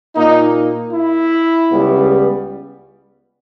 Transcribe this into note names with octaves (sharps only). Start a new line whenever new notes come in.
A#2 A#3 D#4
E4
C#2 C#3 G3 B3